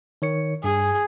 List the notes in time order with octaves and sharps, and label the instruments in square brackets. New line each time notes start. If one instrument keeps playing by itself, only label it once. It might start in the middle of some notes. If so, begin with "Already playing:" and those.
[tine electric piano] D#3 C#5 C#7
[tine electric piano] G2 [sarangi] G#4